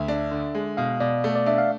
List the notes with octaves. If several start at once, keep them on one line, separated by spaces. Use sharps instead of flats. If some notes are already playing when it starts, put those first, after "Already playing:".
Already playing: D2 E5
D4
D3
G#3
B2 F5
B2 D5
A3
D5
D4 E5
F5